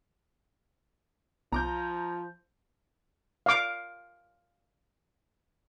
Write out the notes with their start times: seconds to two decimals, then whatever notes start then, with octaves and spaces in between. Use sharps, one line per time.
1.52 B1 F3 A#5 D6 G6
3.46 F5 D6